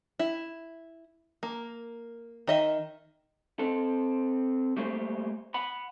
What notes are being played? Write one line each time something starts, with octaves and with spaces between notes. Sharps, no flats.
E4
A#3
D#3 D#5 E5
C4 A4
G3 A3 A#3 G4 B4 C5
F#5 B5